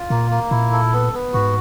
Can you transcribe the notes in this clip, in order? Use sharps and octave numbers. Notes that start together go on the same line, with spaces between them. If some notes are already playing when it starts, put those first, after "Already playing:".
Already playing: F4
A#2 A#3
A#3
A#2 E4
A4
B3
B3
G#2 F#4